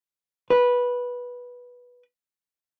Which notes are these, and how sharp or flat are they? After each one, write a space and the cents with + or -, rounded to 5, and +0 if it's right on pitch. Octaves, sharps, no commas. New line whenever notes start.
B4 -10